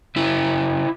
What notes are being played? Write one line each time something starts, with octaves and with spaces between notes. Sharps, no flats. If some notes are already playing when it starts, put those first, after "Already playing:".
F#2 C#3 E4